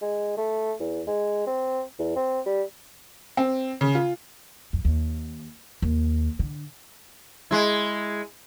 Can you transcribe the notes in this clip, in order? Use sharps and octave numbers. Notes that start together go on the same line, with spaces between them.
G#3
A3
E2
G#3
C4
E2
C4
G3
C4
C#3
F4
F2
D#2
D#2
D3
G#3 E4